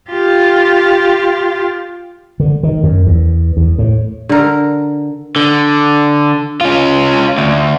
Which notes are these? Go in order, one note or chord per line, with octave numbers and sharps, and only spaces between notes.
F4 G4
D3
D#3
F#2
E2
E2
A2
D3 A#4
D3
C#4 F4
D2